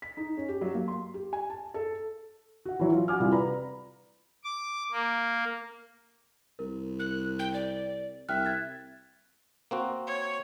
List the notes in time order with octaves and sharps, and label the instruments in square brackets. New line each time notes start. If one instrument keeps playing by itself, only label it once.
[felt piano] B6
D#4
C#4
G4
F#3
A#3
C6
G4
G#5
A5
A4
F#4 F#5
E3 F#3 E4
F4
F#4 F#5 G#5 D6 F6
C3 G3 E4 F4
B4 D5 A#5 B5
[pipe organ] D6
A#3
[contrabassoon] C2 [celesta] A#4
[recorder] F#6
G5
D5
[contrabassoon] C2 [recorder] E5 [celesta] G5 F6 F#6
[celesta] F#6 G#6 A6
[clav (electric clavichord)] A#3 C4 F#4
[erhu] C#5